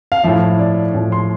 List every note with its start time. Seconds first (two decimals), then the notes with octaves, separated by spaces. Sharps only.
0.12 F5
0.24 A2 F3 E5
0.59 D5
0.94 A2 F3
1.12 C6